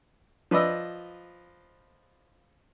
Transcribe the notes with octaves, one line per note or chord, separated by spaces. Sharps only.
F3 B4 D5 D#5 E6